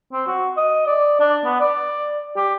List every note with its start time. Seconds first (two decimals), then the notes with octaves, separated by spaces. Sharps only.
0.13 C4
0.27 F#4
0.57 D#5
0.87 D5
1.20 D4
1.45 B3
1.60 D5
2.37 G4